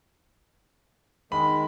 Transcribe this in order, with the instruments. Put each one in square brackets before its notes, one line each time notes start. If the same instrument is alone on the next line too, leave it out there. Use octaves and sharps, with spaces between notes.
[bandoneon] D#3 G#3 [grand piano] B5